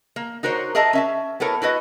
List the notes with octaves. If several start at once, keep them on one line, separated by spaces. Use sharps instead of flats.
A#3
D#4 F#4 A#4 C5 C#5
G#4 A#4 D#5 E5 A5 A#5
C#4 E5 A5
B3 E4 A4 A#4 C#5
E4 F#4 B4 D#5